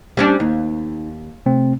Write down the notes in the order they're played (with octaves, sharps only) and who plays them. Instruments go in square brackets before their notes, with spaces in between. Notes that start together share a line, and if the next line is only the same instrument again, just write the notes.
[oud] G3 C#4 D4
[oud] D#2 [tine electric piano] D#4
[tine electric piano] C3 A3 C4